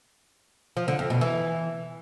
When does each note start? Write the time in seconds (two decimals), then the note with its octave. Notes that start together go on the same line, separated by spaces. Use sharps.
0.77 F3
0.88 D3
0.99 F2
1.10 B2
1.21 E3